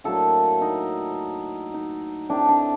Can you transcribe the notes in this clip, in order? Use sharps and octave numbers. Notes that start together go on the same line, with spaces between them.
A2 F#3 A#3 D4 A4
D#4
D#4
A2 A3 C4 D4
D4